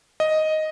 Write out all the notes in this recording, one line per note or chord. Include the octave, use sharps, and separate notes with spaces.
D#5